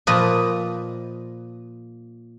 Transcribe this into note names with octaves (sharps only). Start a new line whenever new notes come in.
A#2 F3 B4 D#5